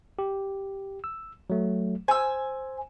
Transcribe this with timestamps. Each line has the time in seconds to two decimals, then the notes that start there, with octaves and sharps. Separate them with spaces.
0.19 G4
1.04 E6
1.50 F#3 A3
2.08 C5 G#5 E6